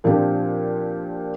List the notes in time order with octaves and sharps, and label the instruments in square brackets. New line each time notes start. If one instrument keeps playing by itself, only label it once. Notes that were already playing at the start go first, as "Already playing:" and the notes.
[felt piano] A#2 F3 C4 D4 G4